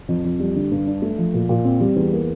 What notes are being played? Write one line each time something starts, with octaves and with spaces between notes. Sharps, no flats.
F2
F2
G3
D3
G2
D4
A3
F3
A#2
A#2
C4
G3
E2
A#3